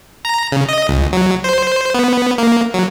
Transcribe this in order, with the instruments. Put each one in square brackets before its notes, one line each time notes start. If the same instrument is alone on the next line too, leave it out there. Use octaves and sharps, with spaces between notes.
[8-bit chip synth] A#5
C#3
D#5
C#2
F#3
C5
B3
A#3
F#3